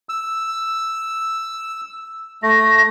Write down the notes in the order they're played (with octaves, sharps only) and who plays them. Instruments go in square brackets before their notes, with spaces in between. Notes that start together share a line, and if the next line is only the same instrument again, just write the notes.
[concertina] E6
[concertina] A3 [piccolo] A#6